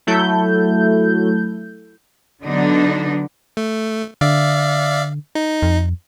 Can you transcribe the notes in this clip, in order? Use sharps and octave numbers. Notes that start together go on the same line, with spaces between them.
F#3 A3 E4 A4 G6
D3 F#3 B3 D4 D#4
A3
D3 D5 E5 F5
D#4
F2